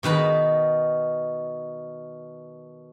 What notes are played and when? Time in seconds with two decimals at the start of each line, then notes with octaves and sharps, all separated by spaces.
0.03 B2 D#3 B4 B5